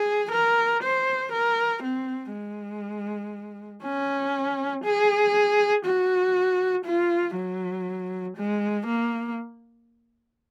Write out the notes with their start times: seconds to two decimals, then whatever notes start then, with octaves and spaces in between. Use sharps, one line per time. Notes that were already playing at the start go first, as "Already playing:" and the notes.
Already playing: G#4
0.32 A#4
0.83 C5
1.32 A#4
1.83 C4
2.33 G#3
3.83 C#4
4.84 G#4
5.85 F#4
6.85 F4
7.36 F#3
8.37 G#3
8.87 A#3